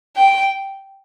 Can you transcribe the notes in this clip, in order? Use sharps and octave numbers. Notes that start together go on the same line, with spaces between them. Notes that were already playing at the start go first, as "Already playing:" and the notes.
G5